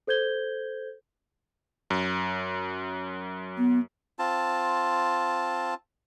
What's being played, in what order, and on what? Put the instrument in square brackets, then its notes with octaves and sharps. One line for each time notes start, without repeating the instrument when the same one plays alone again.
[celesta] A4 C5 G6 G#6 G7
[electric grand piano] F#2
[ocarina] B3
[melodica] C4 F4 A5